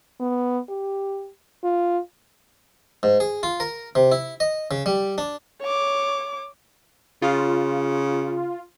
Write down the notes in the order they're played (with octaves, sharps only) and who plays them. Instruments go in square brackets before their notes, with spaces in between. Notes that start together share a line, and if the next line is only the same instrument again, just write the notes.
[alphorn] B3
G4
F4
[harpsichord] G#2
G#4
F4
A#4
C3
E4
D#5
C#3
G3
D4
[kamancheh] C#5 D6
[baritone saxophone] C#3 [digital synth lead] F4